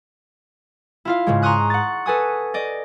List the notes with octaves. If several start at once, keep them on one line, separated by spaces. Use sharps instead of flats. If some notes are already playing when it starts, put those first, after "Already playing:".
E4 F4 F5
G#2 C#3 G#3
A#5 C6 C#6 D#6 F#6
F#5 A6
A4 B4 G#5 D#6
D5 D#5